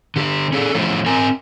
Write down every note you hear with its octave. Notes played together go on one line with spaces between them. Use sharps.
D3 G4
C#4 G#4 A4
F3 A3 C#4 E4 C5
C4 A#4 G#5